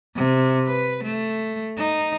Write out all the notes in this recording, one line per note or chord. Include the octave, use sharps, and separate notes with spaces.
C3
B4
A3
D#4